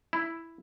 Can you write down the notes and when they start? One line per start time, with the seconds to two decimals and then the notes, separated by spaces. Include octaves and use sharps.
0.13 E4